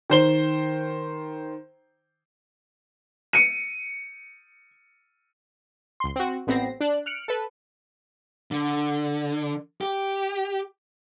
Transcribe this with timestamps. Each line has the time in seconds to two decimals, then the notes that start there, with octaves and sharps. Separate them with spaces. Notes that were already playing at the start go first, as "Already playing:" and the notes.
0.10 D#3 C5 G7
3.33 C#7 D#7
6.00 C#2 C6
6.16 C4 F#4
6.47 A1 B3 C4 A#6 C7
6.81 D4 F#6
7.06 F6 F#6 C#7 D7
7.28 A4 B4
8.51 D3
9.81 G4